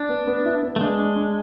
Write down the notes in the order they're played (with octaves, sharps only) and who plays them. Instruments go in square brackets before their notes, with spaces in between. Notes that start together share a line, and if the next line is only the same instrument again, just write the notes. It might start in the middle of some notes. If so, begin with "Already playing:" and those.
Already playing: [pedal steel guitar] D4
[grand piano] B3
B3
E4
B3
[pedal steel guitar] A3
[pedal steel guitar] G#3 [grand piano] D4
[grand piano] D4
D4